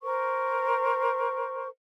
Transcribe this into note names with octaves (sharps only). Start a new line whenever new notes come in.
A#4 C5 C#6